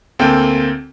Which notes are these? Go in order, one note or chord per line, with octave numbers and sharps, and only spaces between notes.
D2 A#3 C4 A4 G5